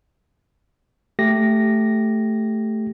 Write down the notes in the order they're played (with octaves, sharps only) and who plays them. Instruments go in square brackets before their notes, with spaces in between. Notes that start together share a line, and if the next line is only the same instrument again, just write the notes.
[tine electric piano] A3 G4 A#6